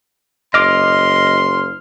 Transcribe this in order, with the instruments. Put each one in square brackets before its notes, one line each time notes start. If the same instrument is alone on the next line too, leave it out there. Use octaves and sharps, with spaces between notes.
[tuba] F#1 [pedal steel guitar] D#5 D6 [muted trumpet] C6 [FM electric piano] F6